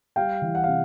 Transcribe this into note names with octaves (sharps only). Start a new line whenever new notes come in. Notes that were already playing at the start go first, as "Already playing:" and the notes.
G3 F5 G5
E3
F#5
C3 F5